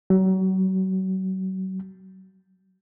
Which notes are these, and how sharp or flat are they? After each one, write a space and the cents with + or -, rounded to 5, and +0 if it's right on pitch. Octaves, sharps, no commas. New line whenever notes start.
F#3 +35